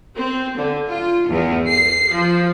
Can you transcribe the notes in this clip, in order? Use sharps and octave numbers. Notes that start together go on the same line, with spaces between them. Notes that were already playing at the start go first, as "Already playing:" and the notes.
C4
D3
F4
E2
C7
F3